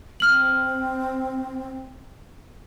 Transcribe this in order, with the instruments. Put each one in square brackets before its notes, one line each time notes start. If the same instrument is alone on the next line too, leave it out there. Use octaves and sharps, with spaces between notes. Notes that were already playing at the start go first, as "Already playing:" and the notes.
[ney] C4 [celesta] F6 F#7